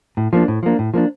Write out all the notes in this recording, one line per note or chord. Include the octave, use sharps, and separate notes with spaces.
A2
F3 A#3 D4
A2
F3 A#3 D4
A2
F3 A#3 D4